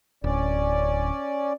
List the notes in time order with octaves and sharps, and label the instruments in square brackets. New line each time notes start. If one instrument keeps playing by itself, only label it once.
[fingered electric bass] D1 [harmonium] C#4 D5